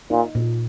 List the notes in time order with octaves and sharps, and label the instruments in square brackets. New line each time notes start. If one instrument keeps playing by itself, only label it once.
[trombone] A#2 [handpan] D#4
[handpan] A#2